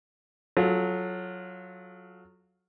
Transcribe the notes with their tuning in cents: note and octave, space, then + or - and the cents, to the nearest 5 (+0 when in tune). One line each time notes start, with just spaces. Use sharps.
F#3 -10 F4 +5 A4 -25